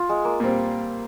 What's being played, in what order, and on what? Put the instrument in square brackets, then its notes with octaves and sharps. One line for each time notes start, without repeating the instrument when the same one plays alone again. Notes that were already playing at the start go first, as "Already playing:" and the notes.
Already playing: [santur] F4
G#3
A#3
[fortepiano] A#2 G3 C4